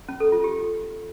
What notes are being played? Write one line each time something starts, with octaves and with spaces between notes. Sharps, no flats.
C#4
A4
F4
G4